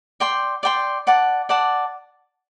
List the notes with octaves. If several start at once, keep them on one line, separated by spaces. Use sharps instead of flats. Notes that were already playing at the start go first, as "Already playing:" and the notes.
D5 G5 C6
D5 G5 C6
D5 F#5 A5
D5 F#5 A5